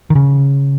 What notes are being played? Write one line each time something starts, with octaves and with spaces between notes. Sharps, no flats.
D#3
C#3